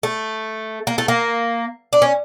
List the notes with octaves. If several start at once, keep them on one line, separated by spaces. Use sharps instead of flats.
A3
A#3
A3
A#3
D4
C#4